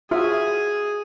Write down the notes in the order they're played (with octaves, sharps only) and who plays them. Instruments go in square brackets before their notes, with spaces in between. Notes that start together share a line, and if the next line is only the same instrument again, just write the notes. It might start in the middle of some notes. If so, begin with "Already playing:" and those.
[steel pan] F4 F#4 E5 [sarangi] G#4